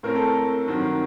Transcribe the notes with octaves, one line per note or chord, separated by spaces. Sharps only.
A2 A3 C4 A#4
A4
A#4
G2 D#3 F#3 C4